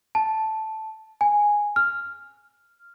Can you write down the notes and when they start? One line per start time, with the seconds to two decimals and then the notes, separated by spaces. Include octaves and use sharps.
0.15 A5
1.21 G#5
1.76 F6